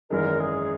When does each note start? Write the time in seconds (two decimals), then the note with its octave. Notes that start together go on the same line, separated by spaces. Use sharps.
0.10 G#1 F#2 E3 G#3 D#4 A#4
0.40 G#4